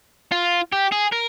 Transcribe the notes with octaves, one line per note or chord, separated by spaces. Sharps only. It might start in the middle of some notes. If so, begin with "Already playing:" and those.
F4
G4
G#4
A#4